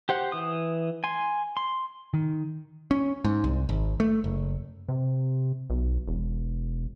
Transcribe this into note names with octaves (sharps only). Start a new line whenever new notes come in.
G4 C5 F#5
E3 D#6
G#5 C6
C6
D#3
C#4
G#2
C2
G#1
A3
F#1
C3
B1
E1